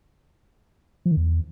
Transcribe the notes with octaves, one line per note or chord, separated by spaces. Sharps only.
F3
D#3
E2